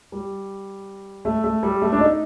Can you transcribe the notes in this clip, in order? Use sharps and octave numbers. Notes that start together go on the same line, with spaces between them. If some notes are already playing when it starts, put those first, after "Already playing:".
G3
A3
A3
G3
A3
D4
D#4